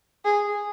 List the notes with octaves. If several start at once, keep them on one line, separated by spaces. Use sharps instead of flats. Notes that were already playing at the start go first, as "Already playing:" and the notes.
G#4